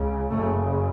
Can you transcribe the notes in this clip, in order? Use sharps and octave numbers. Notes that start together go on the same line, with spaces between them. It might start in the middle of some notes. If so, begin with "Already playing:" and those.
Already playing: C#2 C#3
F#1 F#2 C#3 A3